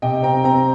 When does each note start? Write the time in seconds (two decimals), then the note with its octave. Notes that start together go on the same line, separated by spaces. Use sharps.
0.02 C3 D#5 G5
0.23 C4 G5 A#5
0.44 C4 G5 A#5